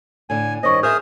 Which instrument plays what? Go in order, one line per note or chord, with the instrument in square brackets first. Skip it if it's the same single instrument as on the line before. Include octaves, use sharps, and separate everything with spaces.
[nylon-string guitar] A2 D3 [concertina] G#5
[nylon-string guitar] G2 D#3 C#4 [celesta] C5 C#6 [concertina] D#5
[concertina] G#4 D#6 F6 [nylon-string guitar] A#4 C5 E5 [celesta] G6